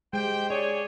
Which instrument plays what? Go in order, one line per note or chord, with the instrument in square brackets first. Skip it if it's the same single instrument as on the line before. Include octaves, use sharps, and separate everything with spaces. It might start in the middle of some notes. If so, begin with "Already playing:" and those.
[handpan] G#3 [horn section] G4 C5 G5
[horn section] G#4 C#5 [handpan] D5